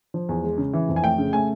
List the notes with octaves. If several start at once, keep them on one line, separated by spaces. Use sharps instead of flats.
F3
E2
G#3
C#3
E3
F2
G#5
A3 G5
C#3
A3 G#5